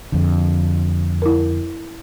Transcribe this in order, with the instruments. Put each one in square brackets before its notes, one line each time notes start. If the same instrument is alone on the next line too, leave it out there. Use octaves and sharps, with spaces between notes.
[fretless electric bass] F2 D3
[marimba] E4 A#4